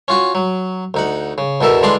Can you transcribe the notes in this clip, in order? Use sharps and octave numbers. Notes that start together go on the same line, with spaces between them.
C#4 F4 F#4
F#3
D2 D#4 F#5
C#3
E2 B2 A4 A#4 E5
D3 E3 G#3 D4 D5 C6